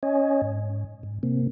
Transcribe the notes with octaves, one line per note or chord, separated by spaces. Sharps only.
C#4 C#5 D#5 G#5
G#2
G#2
C3 A#3 C4